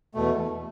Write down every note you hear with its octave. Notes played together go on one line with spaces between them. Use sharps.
E2 B2 A3